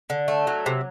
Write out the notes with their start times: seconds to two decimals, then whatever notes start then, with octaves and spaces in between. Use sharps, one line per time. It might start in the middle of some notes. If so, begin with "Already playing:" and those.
0.10 D3
0.28 A3
0.47 F#3
0.66 C3